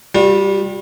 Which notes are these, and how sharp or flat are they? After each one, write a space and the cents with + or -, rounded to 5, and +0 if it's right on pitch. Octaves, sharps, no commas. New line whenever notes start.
G3 +0 F#4 -45